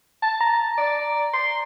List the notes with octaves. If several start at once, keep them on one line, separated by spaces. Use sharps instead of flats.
A5
A#5
D5
C6